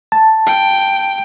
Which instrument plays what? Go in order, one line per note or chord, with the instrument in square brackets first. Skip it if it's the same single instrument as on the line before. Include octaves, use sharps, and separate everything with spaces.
[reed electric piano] A5
[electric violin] G5